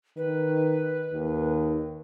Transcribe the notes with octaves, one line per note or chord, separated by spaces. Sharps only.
D#3 B4
D#2 D#3